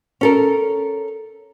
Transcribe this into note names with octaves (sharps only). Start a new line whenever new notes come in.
C#4 A4 A#4